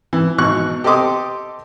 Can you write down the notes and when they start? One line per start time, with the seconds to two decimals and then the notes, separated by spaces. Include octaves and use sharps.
0.13 E3
0.38 G#1 B2 C#6 F#6
0.84 G4 A4 D#5 C6 D6 D#6